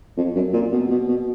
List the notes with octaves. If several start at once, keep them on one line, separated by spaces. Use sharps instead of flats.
F2
F#2
A#2
B2
B2
B2